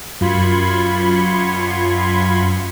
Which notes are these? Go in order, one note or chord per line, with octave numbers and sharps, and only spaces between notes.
F#2 F4 B5 C6 G#6 C#7